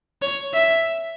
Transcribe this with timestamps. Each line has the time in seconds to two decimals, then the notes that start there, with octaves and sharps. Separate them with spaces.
0.22 C#5
0.54 E5